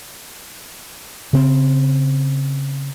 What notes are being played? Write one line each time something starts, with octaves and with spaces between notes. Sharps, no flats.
C#3 C4